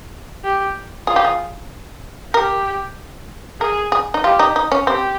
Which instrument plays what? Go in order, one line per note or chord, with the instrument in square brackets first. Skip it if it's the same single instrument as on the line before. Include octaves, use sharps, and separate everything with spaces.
[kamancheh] G4
[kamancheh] F4 [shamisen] G#4
[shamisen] G4
G#4
[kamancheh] G4 [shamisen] A#4
[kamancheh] G#4 [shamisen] A#4
[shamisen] G#4
D#4
[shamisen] F4 [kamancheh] G4
[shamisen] D#4
D#4
C#4
[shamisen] C4 [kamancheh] G4